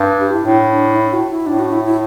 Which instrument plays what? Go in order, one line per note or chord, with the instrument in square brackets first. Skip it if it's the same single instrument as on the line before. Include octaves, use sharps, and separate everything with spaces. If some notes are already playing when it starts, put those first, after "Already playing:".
Already playing: [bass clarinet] G2
[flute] G4
E4
[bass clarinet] A2 [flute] D4
[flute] D4
E4
F#4
E4
[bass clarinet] A2 [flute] D4
[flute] F#4
E4
E4